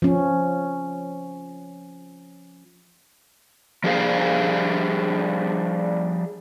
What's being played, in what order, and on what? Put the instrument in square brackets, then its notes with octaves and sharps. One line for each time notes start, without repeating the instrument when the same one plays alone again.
[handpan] F3 C#4
[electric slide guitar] F3 G3 D4 G#4 C5 F5